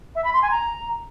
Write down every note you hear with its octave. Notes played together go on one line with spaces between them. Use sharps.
E5
B5
C6
G#5
A#5